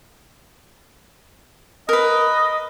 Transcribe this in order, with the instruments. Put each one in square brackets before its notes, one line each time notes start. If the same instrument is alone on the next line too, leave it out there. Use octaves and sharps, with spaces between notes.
[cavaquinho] A#4 B4 [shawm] D#5